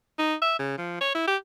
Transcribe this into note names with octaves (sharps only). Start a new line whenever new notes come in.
D#4
E5
C#3
F3
C#5
E4
G4